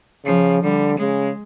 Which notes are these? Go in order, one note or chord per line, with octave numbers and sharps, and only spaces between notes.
C#3 F3
D3 G3
C#3 G#3